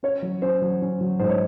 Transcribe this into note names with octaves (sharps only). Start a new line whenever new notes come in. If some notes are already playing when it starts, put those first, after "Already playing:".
C#4 C#5
F#3
C#4 C5
F#3
C#4
F#3
G#2 C5
C#5